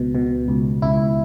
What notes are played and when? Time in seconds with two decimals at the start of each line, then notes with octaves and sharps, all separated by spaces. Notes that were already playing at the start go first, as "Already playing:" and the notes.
Already playing: C#2 B2
0.15 B2
0.48 C#2
0.82 C#2 E4